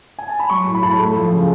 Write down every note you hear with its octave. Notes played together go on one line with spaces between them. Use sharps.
G#5
A5
B5
F#3 C#6
A2
B5
A2 A5
B5
A3
F3
C#3